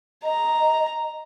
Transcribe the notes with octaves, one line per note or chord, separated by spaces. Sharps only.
D#5 A#5